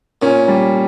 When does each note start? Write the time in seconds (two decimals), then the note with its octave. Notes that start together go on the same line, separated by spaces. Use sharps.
0.22 A#2 C#4
0.48 G3